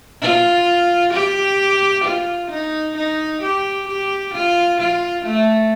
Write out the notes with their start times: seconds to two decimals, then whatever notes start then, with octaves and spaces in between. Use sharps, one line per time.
0.21 F4
1.13 G4
2.05 F4
2.51 D#4
2.96 D#4
3.42 G4
3.88 G4
4.34 F4
4.80 F4
5.25 A3